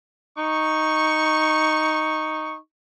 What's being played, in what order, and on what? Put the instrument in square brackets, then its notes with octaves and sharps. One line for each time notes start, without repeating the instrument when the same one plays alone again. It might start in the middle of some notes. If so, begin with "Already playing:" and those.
[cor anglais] D#4 [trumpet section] C#6